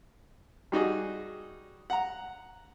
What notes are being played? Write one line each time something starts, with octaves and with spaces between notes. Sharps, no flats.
G3 D#4 F#4 G#4
F#5 A#5